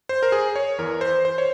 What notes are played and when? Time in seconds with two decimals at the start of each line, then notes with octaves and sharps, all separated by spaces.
0.09 C5
0.23 A#4
0.32 G#4
0.56 C#5
0.78 E2 E3 A#4
1.01 C5
1.25 C5
1.38 C#5